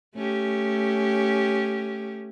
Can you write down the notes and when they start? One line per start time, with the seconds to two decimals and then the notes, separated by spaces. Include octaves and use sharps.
0.15 A3 C#4 G4